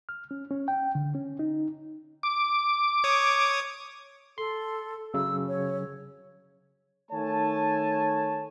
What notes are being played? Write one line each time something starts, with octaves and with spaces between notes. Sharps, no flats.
F6
C#4
C#4
G5
D3
C#4
D#4
D6
C#5 D#6
A4 C6
C#3 F#3 E6
C#5
D#3 A3 C#5 G#5 A5